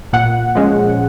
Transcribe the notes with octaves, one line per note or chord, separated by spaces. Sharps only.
A#2 F#5
F3 G#3 C#4